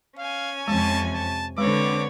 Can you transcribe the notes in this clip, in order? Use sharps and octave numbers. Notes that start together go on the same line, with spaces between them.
C#4 F5 G#5
F2 C3 G#3 A5
A5
D3 G#3 C4 B4 C#5 D6